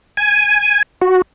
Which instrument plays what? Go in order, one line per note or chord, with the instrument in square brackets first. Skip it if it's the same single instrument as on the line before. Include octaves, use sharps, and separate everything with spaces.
[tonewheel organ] G#5
F#4